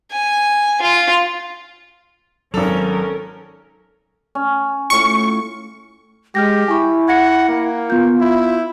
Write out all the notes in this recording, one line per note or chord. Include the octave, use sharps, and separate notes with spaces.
G#5
F4
G#1 F#3 C#4 A4 A#4 F7
C#4
A2 F4 C#6
G#3 G4 F6 G6 A#6
E4 G#5 C#6
F#5 G#6 A#6 C#7
A#3
B3 F4 G6
E4